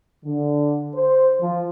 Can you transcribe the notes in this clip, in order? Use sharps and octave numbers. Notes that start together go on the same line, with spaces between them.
D3
C5
F3